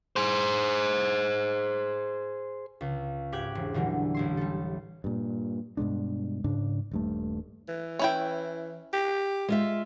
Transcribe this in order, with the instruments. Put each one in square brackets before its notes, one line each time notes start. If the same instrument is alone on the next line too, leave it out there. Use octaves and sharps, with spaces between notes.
[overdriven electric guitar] G#4 C5
[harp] C#2
G#1 G4 D6 F#6 G#6
E1
A#2 D3 E3 F#3 G3
A1 E4 C6
G3 A4
[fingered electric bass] G2 A#2
G2 B2 G#3 D4
G#2 C#3 D4
D#1 G2 A3
[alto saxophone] E3
[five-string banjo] C#4 E4 G5
[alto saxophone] G4
[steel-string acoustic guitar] G#3 F4 E5